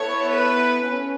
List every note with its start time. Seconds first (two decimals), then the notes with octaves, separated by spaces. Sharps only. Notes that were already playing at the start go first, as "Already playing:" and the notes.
Already playing: B3 E4 A4 C#5
0.32 B4
0.87 C#4